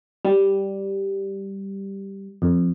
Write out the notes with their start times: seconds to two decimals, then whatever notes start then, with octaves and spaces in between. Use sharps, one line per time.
0.25 G3
2.42 F2